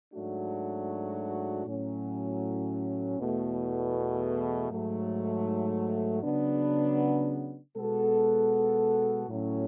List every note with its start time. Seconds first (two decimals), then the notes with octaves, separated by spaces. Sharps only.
0.13 G#2 F#3 A3 D4 F#4
1.66 A2 F#3 C#4
3.18 E2 B2 A3
4.70 G#2 F#3 A3
6.23 C#3 F#3 B3 D4
7.75 B2 G#3 B3 F#4 A4
9.28 A2 F#3 C#4